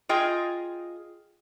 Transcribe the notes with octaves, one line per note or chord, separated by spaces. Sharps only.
F4 G#4 D#5 G5